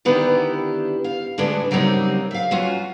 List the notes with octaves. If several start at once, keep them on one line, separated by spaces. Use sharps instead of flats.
D3 D#3 B3 D4 E4 G4
F5
D3 G#3 A3 B3 D4
C#3 F#3 G3 A#3 C4 D#4
E5 F5
F#3 C#4 F4 F#4